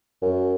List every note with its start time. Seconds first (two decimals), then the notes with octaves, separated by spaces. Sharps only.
0.22 F#2